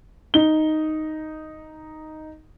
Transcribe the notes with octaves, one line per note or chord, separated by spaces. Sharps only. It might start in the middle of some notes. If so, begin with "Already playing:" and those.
D#4 G7